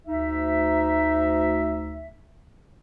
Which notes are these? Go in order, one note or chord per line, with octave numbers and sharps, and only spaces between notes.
D2 D#4 E5